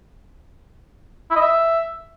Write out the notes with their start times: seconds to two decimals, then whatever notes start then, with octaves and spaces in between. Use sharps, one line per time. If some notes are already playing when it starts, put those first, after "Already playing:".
1.31 E4
1.36 D#5
1.41 E5